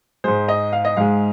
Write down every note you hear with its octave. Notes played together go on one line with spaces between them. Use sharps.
G#2 G#3 C5
D#5
F5
D#5
G#2 G#3 F5